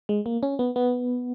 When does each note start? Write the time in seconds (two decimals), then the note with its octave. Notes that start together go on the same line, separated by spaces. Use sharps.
0.09 G#3
0.26 A#3
0.43 C#4
0.59 B3
0.76 B3